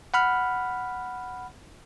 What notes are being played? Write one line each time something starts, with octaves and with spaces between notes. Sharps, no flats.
F#5 B5 F6